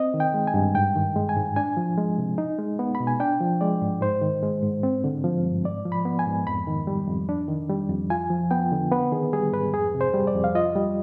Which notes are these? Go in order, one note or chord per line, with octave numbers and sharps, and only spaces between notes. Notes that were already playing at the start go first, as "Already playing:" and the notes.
Already playing: C4 D#5
D#3
G5
G#3
G#5
G2
G#2 G5
D#3
G#3
G#5
G#2
D4 G#5
F3
G#3
C3
D#4
G#3
B3
B5
B2
G#5
D4 G5
F3
G#3 D5
G#2
G#2 C5
D#3
G#3
G#2
C4
D3
F3
G2
G#2 D5
F3
B5
B3
G#5
G#2
F2 B5
D#3
G3
F2
D4
D#3
G3
F2
F4 G#5
F3
B3 G5
D3
B3 B4
D#3 G#4
G3 G#4
G#2 B4
F2 G#4
C3
C5
G3
D5
F2
F5
F4 D#5
G3